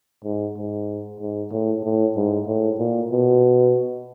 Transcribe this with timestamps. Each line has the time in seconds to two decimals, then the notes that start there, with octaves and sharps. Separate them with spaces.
0.24 G#2
0.57 G#2
1.20 G#2
1.52 A2
1.83 A2
2.16 G#2
2.47 A2
2.79 A#2
3.11 B2